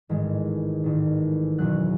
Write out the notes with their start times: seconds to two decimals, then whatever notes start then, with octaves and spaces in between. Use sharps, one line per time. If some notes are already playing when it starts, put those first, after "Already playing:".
0.09 A1 G#2 D#3 G#3
0.84 A1 G#2 D#3
1.58 F#1 E2 B2 F#3 F#6